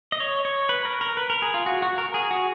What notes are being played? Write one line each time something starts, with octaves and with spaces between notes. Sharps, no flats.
D#5
C#5
C#5
B4
A#4
A#4
B4
A#4
G#4
F4
F#4
F#4
A#4
G#4
F#4